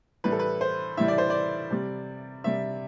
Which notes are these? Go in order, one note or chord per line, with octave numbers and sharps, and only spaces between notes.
A2 E3 G3 B4
A4
B4
C5
A2 E3 G3 E5
D5
C5
D5
C3 G3
C3 G3 E5